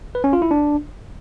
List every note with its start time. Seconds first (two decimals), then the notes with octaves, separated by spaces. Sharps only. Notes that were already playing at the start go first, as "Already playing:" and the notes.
0.15 B4
0.24 C#4
0.33 F4
0.42 E4
0.51 D4